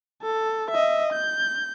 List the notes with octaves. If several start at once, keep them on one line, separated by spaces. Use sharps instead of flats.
A4
D#5 E5
G6